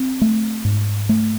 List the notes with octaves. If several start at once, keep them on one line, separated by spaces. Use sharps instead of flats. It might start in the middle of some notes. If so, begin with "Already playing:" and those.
Already playing: C4
A3
G#2
A3